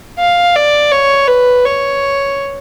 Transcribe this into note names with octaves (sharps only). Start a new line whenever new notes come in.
F5
D5
C#5
B4
C#5